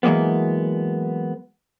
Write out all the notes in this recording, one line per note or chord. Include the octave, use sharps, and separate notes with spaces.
E3 F#3 G#3 A#3 B3